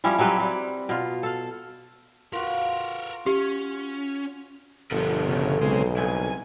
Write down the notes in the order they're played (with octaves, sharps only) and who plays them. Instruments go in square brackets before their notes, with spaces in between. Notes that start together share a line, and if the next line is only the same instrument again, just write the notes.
[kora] F3 G3 C#4 E4
F#3 G3 C4 B4
G3
B2 F4
A4 F5
[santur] F4 F#4 [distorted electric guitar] A#4 B4
[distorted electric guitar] C#4 [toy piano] G4
[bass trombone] G1 [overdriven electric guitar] B2 F3 [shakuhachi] A4
[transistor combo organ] C#3
[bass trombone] B1 [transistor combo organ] C#3 G#3 C4
[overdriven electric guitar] C2 [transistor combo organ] G#5